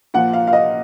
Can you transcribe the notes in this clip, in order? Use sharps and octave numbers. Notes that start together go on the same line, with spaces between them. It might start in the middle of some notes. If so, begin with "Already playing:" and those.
A#2 F3 F#5
F5
F5
D#5